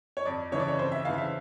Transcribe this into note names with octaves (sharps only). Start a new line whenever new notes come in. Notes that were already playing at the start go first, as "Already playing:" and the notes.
C#5
F2 D5
C#3 E3 C#5
D5
C#5
F2 C5
E5
C#3 E3 F5
E5